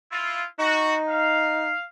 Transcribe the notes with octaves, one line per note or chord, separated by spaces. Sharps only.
E4 F4
D#4 F#4
F5